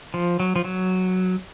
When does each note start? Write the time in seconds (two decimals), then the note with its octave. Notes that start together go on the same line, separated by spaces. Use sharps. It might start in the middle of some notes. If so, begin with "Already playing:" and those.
0.14 F3
0.40 F#3
0.56 F3
0.65 F#3